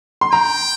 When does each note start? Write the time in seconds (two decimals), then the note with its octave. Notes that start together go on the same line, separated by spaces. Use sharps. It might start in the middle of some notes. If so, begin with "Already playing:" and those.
0.21 C6
0.32 G5 A#5